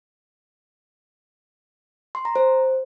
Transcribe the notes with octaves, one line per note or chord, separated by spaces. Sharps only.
C6
A#5
C5